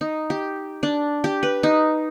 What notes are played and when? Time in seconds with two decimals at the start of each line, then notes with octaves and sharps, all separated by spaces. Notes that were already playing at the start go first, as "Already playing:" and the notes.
0.01 D#4
0.30 G4
0.83 D4
1.24 G4
1.43 B4
1.63 D#4